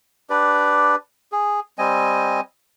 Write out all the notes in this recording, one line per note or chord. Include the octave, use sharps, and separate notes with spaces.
D4 G4 B4 D5
G#4
G3 C4 D#5 G#5